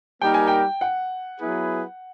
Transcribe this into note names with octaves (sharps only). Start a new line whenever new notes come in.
G3 A#3 D#4 G4 A#4 G5
G#5
G5
F#5
F#3 B3 E4 G#4 B4